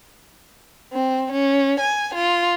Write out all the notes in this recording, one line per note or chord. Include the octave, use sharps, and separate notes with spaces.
C4
C#4
G#5
F4